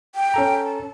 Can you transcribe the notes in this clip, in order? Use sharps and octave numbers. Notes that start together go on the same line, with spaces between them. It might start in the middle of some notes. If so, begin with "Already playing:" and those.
G5
C#4 A4 A#5
A5